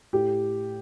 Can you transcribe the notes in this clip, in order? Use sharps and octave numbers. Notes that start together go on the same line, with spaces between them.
A2 G4